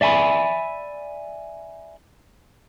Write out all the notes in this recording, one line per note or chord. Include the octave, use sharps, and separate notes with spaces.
D5 E5 G#5 A#5 B5